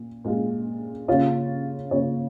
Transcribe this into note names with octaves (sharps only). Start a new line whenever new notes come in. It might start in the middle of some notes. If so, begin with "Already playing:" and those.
Already playing: A#2
A#2 G#3 F4
C#3 A#3 F4 C#5
C#3 A#3 F4 C#5